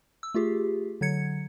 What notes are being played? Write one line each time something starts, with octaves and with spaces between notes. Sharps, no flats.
E6
A3 F4 G4 G#4
D3 F#3 G#6 C#7